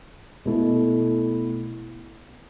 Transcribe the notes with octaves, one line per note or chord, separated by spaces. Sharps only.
B2 A3 E4 A4